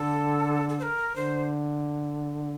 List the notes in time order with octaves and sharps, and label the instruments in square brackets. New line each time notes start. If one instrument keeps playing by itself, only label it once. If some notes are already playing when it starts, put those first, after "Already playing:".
Already playing: [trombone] D3 [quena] A4
[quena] A4
C5
A#4
[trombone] D3 [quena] C5